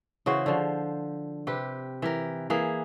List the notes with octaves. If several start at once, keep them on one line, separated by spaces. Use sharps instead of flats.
C#3 E3 F#4 C5
D3 F3
C3 G4 B4
E3 G4 A#4
E3 A#3 G#4